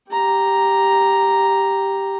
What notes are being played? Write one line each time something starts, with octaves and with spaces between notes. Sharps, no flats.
G4 A#5